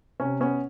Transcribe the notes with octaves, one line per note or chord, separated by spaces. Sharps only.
C3 C#4
B3 C#4